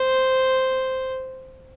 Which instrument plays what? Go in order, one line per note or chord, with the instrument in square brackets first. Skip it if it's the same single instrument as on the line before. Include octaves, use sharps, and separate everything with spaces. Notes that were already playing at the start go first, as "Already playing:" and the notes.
Already playing: [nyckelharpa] C5